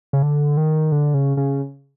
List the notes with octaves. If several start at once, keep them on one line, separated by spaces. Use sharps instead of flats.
C#3
D3
D#3
D3
C#3
C#3